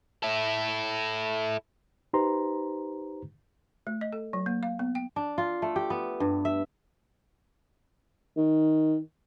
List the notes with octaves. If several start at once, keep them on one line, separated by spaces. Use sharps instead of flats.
E4 A4
D#4 G4 B4 C5 A#5 C6
A3
D#5
A4
F#3
A#3
F5
B3
G5
D4
F4
A3
G4
B3
G2
E5
D#3